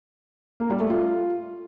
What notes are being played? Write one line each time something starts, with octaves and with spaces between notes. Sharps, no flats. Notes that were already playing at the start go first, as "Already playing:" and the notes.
A#3
G3
A3
F4